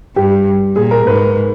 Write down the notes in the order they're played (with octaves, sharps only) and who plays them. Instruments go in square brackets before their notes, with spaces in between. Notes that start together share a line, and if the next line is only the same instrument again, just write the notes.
[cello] G2 [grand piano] G4
[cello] A#2 [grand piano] G#4
[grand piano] A#4
[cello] G#2 [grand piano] B4